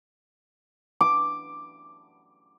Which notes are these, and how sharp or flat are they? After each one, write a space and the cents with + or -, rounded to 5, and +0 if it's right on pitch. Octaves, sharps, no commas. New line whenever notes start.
D6 +5